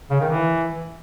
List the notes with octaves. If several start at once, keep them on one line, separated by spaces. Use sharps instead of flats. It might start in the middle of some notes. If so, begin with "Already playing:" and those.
C#3
D#3
E3